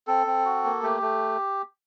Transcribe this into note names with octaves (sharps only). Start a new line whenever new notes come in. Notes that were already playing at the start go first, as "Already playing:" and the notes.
C4 A4
C4
F#4
A#3
A3 G4
A3